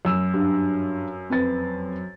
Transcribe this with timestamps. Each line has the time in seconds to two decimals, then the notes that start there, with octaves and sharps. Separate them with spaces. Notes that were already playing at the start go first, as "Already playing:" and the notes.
0.05 F#2 E6
0.34 G2
1.30 F2 B4 A6